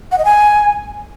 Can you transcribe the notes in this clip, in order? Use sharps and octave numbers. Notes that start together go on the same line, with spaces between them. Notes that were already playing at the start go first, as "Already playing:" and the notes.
F#5
D#5
G#5